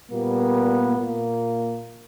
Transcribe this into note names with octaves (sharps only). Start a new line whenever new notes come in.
A#2 G3 A#3 B3
A#2 A#3